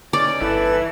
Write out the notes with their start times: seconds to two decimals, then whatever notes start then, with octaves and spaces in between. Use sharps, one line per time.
0.13 C#4 D#4 C#5 D5
0.41 G1 E3 E4 A4 B4 E6